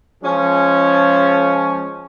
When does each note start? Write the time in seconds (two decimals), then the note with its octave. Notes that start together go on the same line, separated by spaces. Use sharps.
0.23 F3 G#3 C#4